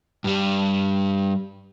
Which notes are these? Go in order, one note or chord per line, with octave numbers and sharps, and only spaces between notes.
G2 G3